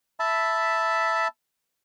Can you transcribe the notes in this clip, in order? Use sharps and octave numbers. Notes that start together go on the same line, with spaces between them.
E5 A5 B5